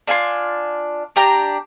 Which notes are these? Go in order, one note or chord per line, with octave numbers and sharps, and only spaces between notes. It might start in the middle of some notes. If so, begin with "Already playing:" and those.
D4 F4 G#5 C6
D4 G4 A#5